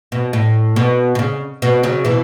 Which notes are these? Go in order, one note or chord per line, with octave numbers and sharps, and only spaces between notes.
B2
A2
B2
B2
C#3
B2
C#3 F#3
B2 E3